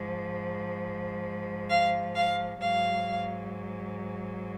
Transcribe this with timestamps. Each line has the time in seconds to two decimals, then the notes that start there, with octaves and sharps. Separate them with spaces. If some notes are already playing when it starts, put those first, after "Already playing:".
Already playing: G#2 F3
1.69 F5
2.15 F5
2.61 G#2 F#3 F5